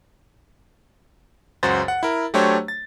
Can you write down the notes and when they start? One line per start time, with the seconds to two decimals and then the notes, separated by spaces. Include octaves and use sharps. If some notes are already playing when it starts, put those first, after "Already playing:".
1.63 C#2 F#2 F#4 C5 A6
1.88 F#5
2.03 E4 A#4
2.34 F#3 A3 D4 G4 C5 C#5
2.68 A6